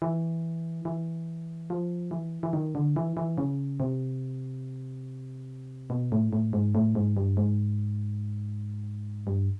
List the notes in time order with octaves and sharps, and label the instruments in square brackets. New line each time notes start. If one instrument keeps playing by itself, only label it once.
[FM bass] E3
E3
F3
E3
E3
D#3
D3
E3
E3
C#3
C3
B2
A2
A2
G#2
A2
G#2
G2
G#2
G2